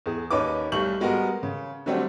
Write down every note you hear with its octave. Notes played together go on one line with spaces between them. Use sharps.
E2 G#4
D#2 C#4 D#4 B4 D6
B1 G3 A3 C#6 G6 F#7
G3 G#3 B3 F#4 A#4
C#3
D3 F#3 G3 A3 C4 D4